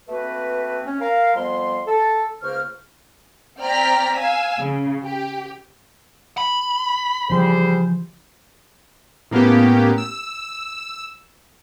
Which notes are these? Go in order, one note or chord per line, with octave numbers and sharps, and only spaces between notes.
A3 A#3 C4 F#4 B4
C#4
A#4 F5
F2 G3 B3 C6
A4
C#2 C#3 A#3 C5 C#6 F6
C4 D5 G5 A#5 F6 B6
F5 G#5 E6
C#3
G4
B5
C#3 E3 F3 G3 G#4 C5
A2 A#3 B3 C#4 G4
E6